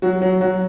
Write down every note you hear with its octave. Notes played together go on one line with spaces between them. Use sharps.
F#3 F#4
F#3 F#4
F#3 F#4